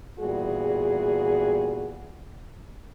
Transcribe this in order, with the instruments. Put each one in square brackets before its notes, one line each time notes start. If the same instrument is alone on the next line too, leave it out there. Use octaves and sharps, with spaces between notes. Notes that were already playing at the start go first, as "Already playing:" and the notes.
[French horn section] E2 A#2 G3 F#4 G#4